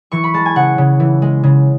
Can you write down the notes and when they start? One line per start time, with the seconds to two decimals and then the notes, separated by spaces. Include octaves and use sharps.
0.12 E3 C#6
0.24 B5
0.34 G#3 A5
0.46 G#5
0.55 C#3 F#5
0.78 C#3
1.00 E3
1.22 G#3
1.43 C#3